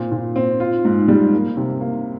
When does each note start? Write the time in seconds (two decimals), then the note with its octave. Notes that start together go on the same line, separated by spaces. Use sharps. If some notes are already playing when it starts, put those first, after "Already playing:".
Already playing: A#2 C4
0.12 A#2
0.36 C4
0.60 F4
0.85 G#2
1.08 G3
1.33 A#3
1.57 C3
1.81 A#3